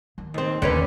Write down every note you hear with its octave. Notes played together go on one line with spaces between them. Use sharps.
D#3
D#2 C4
D#2 D3 C#4 B4